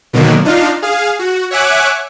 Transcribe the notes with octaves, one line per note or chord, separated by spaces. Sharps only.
B2 D3 D#3 F#3 A#3 B3
D4 D#4 F4 F5
G#4 F5
F#4
C#5 E5 F#5 G#5 D6 F#6